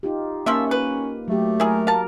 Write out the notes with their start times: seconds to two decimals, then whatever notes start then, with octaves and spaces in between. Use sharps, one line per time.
0.03 D#4 F4 G4
0.46 F3 A#3 C#4 F4 E5
0.71 B4
1.28 F#3 A3 G4
1.60 E4 G#4 A#4
1.87 A#4 F5 A5